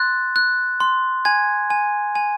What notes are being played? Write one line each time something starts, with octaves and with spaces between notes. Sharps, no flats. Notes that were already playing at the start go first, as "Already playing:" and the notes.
Already playing: C6 F#6 A6
F#6
C6
G#5 G#6
G#5
G#5